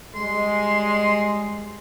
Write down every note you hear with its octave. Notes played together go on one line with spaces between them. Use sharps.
G3 G#3 C6